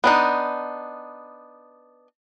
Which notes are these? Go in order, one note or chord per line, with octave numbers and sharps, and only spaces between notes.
B3 D4 D#4